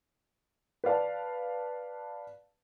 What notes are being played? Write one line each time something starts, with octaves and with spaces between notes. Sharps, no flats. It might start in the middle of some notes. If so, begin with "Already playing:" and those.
B4 D5 F5 A5